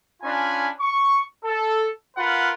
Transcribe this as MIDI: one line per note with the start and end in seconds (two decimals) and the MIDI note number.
0.23 0.69 61
0.23 0.69 62
0.23 0.69 65
0.23 0.69 80
0.23 0.69 83
0.80 1.21 85
1.44 1.89 69
2.17 2.51 65
2.17 2.51 70
2.17 2.51 71
2.17 2.51 78
2.17 2.51 83